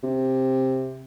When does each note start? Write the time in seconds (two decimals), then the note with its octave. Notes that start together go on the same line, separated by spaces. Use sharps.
0.03 C3